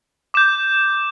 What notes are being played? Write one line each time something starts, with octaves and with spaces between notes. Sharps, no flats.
D6 G6 E7